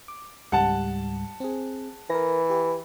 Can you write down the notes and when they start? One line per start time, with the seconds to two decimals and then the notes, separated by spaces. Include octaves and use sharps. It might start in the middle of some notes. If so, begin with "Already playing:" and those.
0.08 D6
0.52 C#2 G#2 G3 F#5 A5
1.40 C4 G#4
2.10 E3 A#4 A#6
2.50 G4